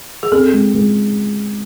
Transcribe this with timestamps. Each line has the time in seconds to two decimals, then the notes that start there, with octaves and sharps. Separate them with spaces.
0.23 G#4
0.32 C4 A4
0.53 G#3
0.74 G#3